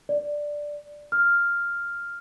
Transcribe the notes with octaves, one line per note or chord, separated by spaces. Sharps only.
D5
F6